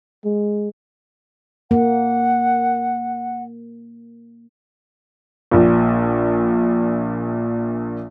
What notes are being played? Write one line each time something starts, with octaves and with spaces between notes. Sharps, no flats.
G#3
A#3 F#5
A#1 A#2